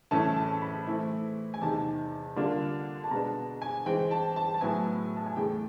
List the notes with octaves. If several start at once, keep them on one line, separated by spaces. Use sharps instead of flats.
A2 E3 A3 C#4 E4 A5
A5
B5
E3 A3 C4 E4
G#5
E2 C3 D#3 A5
D3 G3 A#3 D4 F4
A5
B2 G#3 B3 D4 A#5
G#5
E3 G#3 C4 G5
A5
A5
A5
A2 F#3 B3 E4 G#5
A5
G#5
E2 C#3 E3 A3 G5